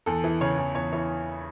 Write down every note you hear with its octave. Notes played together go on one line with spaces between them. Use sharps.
E2 A4
E3
C#3 C#5
E2
E2 C#5
E3 C#5